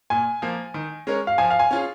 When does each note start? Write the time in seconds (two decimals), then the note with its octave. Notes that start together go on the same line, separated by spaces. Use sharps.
0.10 A#2 G#5
0.42 F3 A#3
0.74 D#3
1.07 G#3 C#4 A#4 C#5
1.27 F5
1.38 F3 G#5
1.50 F5
1.59 G#5
1.71 C#4 F4 G#4